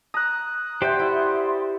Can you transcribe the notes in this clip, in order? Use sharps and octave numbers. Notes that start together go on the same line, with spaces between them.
A#5 D#6 F#6
G4 C5 D5 E5 F#5 G5 C6
E4